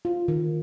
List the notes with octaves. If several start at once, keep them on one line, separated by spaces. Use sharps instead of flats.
F4
D#3